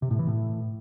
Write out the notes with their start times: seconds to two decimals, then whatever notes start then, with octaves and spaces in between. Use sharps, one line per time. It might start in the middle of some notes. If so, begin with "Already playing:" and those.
0.02 C3
0.11 A2
0.19 E3
0.27 A2